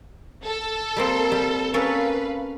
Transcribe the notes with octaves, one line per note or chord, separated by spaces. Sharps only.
A4
G3 A#3 C4
G3
A#3 C#4 A4 B4 F5